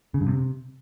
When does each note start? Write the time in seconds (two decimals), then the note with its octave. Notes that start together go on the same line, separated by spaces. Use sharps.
0.14 C#3
0.21 G2
0.28 C3